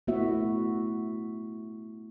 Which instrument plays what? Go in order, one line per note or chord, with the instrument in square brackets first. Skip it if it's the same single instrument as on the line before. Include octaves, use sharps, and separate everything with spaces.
[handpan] A3 B3 E4 F#4 E5